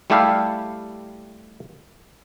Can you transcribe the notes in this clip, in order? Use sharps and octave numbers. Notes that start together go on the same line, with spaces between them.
G3 A3 E4 G4 A4 F5